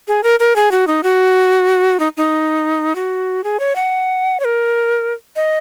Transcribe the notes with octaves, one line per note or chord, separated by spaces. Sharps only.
G#4
A#4
A#4
G#4
F#4
D#4
F#4
D#4
D#4
F#4
G#4
C#5
F#5
C#5
A#4
D#5